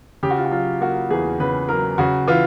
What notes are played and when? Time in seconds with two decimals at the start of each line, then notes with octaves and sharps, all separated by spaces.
0.23 C#3 G4
0.30 F#4
0.37 F4
0.45 F#4
0.51 F#3 F4
0.81 A#3 F#4
1.10 E2 G#4
1.40 C#3 B4
1.69 F#3 A#4
1.98 C#3 F#4
2.28 E3 F4